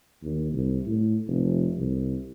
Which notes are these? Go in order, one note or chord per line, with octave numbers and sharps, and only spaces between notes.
D#2
C2
A2
F1
C2